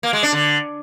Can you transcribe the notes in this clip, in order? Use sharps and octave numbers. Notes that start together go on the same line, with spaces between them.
A#3
G#3
D4
D3